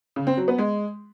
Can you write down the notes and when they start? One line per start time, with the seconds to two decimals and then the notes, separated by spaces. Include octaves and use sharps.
0.16 C#3
0.27 C4
0.37 F#3
0.48 B3
0.58 G#3